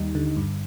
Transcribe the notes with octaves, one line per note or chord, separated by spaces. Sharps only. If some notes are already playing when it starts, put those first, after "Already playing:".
Already playing: D#2 G3 D#4
D3
G2